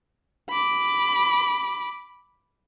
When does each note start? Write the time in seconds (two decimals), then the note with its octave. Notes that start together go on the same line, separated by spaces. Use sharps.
0.50 B5 D6